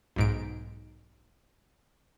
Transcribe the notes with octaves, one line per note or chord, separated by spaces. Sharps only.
B1 G#2 D7